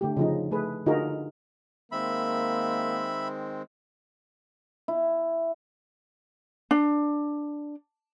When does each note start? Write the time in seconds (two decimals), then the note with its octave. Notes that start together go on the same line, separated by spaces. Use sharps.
0.01 D3 A3 G4
0.17 C#3 F3 D#4
0.51 A3 G#4 B4
0.86 D3 D#4 F4 F#4 G#4 A#4
1.92 D#3 G#3 A#3 C4 E5 B5
4.88 E4
6.71 D4